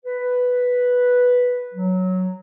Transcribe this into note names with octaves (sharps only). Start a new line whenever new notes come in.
B4
F#3